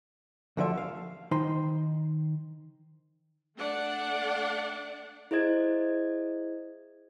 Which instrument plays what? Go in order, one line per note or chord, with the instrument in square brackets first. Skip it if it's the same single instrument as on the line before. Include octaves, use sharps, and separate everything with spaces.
[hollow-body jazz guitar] D2 D3 F3 E5
F5
D#3 D#4 C5 C6
[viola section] A3 D4 D5 F#5
[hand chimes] E4 G#4 C5 D#5 G#6